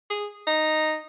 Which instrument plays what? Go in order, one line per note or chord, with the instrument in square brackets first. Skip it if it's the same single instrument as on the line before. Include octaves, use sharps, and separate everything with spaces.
[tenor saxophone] G#4
D#4